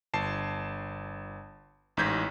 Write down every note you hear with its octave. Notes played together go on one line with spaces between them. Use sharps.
G1 A5 C7
A1 G#2 G6 G#6 B6